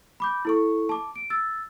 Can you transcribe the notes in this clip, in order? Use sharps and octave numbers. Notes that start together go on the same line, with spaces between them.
B5 D6 G6
E4 A4 C#6
A5 D6
D7
E6 A6